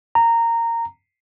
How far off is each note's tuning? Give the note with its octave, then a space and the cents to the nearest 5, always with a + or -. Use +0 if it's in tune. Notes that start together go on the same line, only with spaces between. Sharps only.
A#5 -15